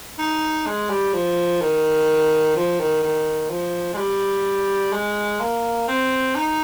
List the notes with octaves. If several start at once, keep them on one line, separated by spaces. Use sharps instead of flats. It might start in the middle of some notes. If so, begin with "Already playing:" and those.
D#4
G#3
G3
F3
D#3
F3
D#3
D#3
F3
G#3
G3
G#3
A#3
C4
D#4